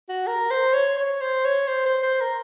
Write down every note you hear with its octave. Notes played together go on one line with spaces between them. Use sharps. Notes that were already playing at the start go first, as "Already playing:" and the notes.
F#4
A#4
C5
C#5
C#5
C5
C#5
C5
C5
C5
A#4